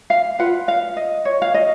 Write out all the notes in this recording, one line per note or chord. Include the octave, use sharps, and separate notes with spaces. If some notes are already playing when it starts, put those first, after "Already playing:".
F5
F4 B4 F#5
F5
D#5
C#5
F5
D#5